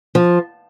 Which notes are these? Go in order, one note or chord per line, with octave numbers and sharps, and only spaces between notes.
F3